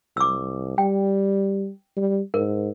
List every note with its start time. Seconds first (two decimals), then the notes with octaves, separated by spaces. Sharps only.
0.17 C2 D6 E6
0.78 G3 G5
1.96 G3
2.34 G#2 A#4